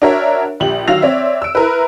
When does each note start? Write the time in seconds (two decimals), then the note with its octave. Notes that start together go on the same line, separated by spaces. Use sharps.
0.02 D4 F#4 A#4 C#5 E5
0.60 A#1 G4 F#7
0.87 D#3 F#3 F5 E6 A#6 F7
1.02 C4 C#5 D5 E5
1.42 E6 D7
1.55 E4 A#4 B4